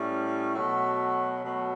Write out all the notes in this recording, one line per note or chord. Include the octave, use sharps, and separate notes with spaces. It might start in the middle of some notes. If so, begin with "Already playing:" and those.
Already playing: A2 G3 C#4
B2 F#3 A3
B2 F#3 A3